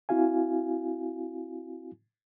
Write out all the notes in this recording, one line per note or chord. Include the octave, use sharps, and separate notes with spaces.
C4 E4 F#4 F5 G#5